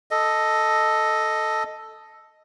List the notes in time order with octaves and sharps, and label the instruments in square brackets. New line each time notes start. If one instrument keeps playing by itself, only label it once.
[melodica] A4 D#5